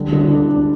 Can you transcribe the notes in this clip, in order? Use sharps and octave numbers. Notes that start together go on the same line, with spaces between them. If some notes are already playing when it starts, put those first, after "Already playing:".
Already playing: D3 G3
D3
D4
D4